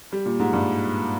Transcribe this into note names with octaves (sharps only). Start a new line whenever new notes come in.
G3
A#2
G#2
G2